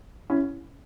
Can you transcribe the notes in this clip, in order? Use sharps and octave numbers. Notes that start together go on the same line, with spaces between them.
C#4 E4